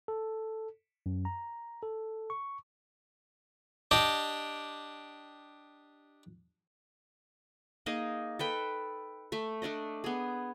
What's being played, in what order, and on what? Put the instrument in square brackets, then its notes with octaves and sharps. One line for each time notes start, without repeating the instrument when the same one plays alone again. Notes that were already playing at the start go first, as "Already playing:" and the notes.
[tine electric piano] A4
F#2
A#5
A4
C#6
[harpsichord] D4 G4 D#5
[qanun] A#3 D#4 G#4 D#5
A4 B4 G5
A3 E5
A3 D4 D5 D#5
B3 G#4